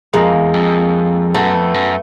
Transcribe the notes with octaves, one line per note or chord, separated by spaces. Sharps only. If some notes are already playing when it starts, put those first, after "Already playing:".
F2 G#3 A#3
E2
F2
F#2 A3 B3
F2
F#2